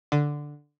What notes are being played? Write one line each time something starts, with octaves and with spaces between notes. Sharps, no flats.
D3